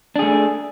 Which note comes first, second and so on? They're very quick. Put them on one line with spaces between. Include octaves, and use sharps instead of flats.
D4 G#4 A3